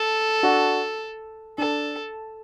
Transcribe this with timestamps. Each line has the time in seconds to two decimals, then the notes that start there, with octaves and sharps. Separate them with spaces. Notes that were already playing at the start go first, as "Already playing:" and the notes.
Already playing: A4
0.43 D4 F#4
1.58 D4 A4